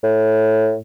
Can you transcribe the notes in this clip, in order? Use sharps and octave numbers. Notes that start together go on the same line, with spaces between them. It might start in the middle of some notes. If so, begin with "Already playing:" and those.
A2